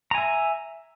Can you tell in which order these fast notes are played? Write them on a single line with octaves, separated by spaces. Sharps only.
A#5 G#5 E5